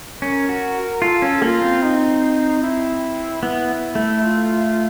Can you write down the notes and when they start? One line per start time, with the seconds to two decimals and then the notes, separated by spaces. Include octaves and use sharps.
0.22 C#4 A#4
0.49 F#4
1.02 F4 A4
1.22 C#4
1.42 A#3 F4
1.62 C4
1.82 D#4
2.62 E4
3.42 B3 E4
3.95 A3
4.22 F4